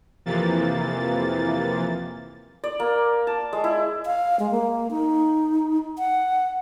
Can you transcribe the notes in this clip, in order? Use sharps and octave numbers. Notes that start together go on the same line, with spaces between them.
F2 C3 E3 A#3 A6
D5
A#3
A5
G#3
E4
F5
G#3
A#3
D#4
F#5